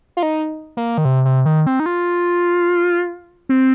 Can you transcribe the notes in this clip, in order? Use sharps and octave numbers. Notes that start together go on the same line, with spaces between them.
F4
D#4
A#3
D#3
C3
C3
D#3
C4
D#4
F4
C4